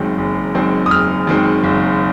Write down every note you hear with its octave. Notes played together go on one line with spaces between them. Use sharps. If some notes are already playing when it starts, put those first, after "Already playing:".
Already playing: F#1 F#2 D#3 G#3 C4
F#1
F#2 D#3 G#3 C4
D#6
F#1 F6
F#2 D#3 G#3 C4
F#1